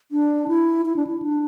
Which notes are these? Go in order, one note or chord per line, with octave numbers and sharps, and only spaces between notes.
D4
E4
E4
D4
E4
D4